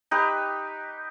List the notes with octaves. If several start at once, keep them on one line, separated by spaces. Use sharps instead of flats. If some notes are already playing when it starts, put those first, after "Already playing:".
D#4 G4 B4